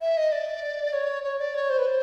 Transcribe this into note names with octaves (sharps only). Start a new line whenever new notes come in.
E5
D#5
D5
C#5
C#5
D5
C#5
C5
B4
C5